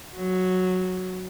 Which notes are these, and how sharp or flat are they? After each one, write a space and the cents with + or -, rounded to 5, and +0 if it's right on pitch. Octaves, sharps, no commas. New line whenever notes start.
F#3 -5